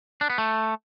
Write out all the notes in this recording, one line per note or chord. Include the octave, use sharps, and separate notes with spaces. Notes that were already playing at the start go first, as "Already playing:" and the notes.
D4
B3
A3